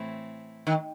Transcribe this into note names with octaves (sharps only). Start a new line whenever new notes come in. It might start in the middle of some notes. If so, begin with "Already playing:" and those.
Already playing: A2 E3 A3 C4 E4
D#3